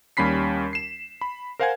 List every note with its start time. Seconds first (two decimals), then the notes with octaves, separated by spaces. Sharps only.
0.17 D#2 G3 C#4 B5 B6 C7
0.73 C7 E7
1.21 B5
1.59 A#4 C5 F5 F#5 G#5 G#6